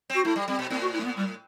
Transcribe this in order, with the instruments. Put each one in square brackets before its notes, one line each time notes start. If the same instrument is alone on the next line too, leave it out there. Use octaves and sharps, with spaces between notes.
[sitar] C4 [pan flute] F#4
[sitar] A3 [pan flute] E4
[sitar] G3
[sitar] G3 [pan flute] C4
[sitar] B2
[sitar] A2 [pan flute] C4
[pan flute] F#4
E4
A3
B3
G3